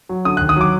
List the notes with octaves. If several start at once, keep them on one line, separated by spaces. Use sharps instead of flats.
F#3
D3 D#6
D#2 F#6
D#6
F#3 D6